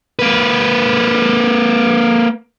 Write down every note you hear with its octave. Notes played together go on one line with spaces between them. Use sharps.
A#3 B4